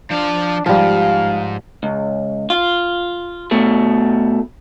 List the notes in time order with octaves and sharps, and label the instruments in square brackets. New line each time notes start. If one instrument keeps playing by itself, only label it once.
[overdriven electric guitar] F3 F5 [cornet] D4
[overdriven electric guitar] G#2 [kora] F3 G3 [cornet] F5
[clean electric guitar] C#2
F4
B2 A3